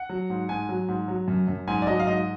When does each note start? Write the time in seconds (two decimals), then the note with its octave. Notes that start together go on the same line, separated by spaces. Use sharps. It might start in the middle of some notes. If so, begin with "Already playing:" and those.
Already playing: F#5
0.09 F#3
0.30 G#2
0.49 G#2 G#5
0.69 F#3
0.88 G#2
1.08 F#3
1.28 F#2
1.48 F#2
1.68 G#2 G#5
1.82 D5
1.87 F#3 D#5
1.99 F5
2.07 G#2 D#5